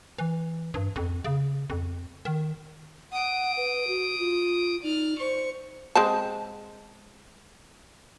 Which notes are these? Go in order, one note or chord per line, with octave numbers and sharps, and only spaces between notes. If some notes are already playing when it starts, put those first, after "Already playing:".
E3
G2
F2
C#3
F2
D#3
F#5 D#6 D7
B4
F#4
F4
D#4 D5 F6
C5 C#6
G#3 C4 A5